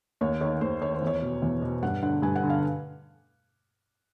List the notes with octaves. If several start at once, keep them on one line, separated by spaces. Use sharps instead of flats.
D#2 C#5
D#3 C#5
D#2 C5
D#3 C#5
C5
E2
C#5
B2
E2
B2
G2 F#5
D3 F#5
G2 G#5
F#5
D3
F5